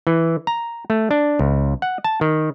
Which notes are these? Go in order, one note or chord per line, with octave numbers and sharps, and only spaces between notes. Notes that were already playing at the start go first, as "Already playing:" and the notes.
E3
A#5
A3
D4
C#2
F#5
A5
D#3